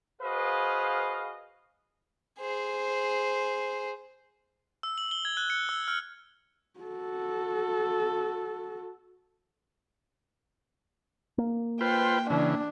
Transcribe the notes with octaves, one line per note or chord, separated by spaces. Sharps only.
F#4 G#4 B4 C5 D#5 F5
G#4 C5
E6
F#7
G7
G#6
F#6
C#7
E6
F6
F#4 A4
A#3
F4 B4 C5 G5
C#3 E3 D4